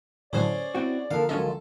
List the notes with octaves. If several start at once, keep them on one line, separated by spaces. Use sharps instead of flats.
A2 D3 F#3 C#4 G#4 C5 D5
C4 E4 F#4 G5
D3 F3 A#3 A4 A#4 F5
C#2 D#3 F#3 C#4 F4 A4 D#5